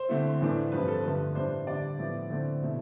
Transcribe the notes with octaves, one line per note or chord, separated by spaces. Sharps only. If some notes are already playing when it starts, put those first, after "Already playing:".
Already playing: C5
D3 A3 C4 E4
A2 E3 A3 D4
G2 F3 C4 B4
A4
G2 D3 F3 A3 B4
A2 E3 G3 D4 C5
D3 G3 D4 D5
A2 F3 B3 E4
D3 A3 C4 E4
B2 A3 E4